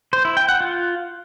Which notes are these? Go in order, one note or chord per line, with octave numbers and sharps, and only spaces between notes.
C5
E4
G5
F#5
F4